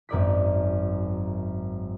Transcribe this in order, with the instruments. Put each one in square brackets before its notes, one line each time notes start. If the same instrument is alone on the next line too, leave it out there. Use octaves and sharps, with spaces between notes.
[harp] G#1 F#2 A#4 D5 D#6 B6